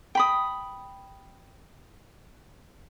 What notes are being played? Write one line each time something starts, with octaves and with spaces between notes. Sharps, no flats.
G5 B5 D#6